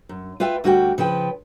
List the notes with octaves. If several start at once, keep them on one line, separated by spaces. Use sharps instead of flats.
F#2
F4 B4 E5 G5
D2 G3 F#4 G4 B4 G5
C#3 F3 B4 G5